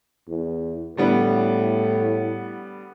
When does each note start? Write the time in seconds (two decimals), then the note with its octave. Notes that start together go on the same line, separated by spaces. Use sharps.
0.28 E2
0.97 A2 D3 G3 B3